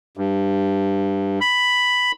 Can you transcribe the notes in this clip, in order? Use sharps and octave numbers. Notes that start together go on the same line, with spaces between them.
G2
B5